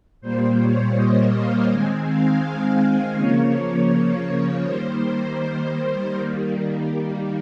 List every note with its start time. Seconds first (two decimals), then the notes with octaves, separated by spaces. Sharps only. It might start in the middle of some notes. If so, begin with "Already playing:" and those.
0.21 A#2 G3 A#3 C5
0.59 C#5
0.95 D#5
1.33 F5
1.69 D#3 G#3 C4 G#5
2.06 F5
2.42 F5
3.16 C#3 F3 A#3 C#5
4.64 D#3 G3 A#3 C5
6.12 D#3 G3 A#3